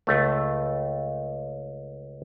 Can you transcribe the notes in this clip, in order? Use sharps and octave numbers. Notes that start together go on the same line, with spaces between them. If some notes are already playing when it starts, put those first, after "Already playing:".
C#2 A3